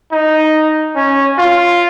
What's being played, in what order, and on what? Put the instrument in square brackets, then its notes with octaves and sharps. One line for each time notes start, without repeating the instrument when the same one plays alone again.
[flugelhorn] D#4
C#4
F4